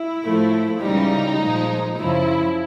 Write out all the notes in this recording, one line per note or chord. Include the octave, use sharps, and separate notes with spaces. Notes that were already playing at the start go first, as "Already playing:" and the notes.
Already playing: E4
A2 F3 A3
C#2 C#3 E3 G3 D#4
A#2 F3 G#3
F#2 C#3 F3 E4